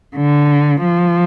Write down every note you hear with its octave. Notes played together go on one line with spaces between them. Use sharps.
D3
F3